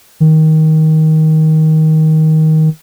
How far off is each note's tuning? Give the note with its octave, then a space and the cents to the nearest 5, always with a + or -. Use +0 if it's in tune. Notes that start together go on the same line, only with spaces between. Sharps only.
D#3 +15